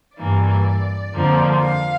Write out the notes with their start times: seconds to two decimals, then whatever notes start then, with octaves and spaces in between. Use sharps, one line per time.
0.17 G2 E3 A#3 D5
1.14 F2 D3 F3 A#3
1.62 F5